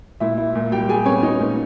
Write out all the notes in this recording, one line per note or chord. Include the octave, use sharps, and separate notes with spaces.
A#2 E4 E5
E4
A#2
G3 G4 G5
G3 G#4 G#5
B3 C#4 C#5
D#4
A#2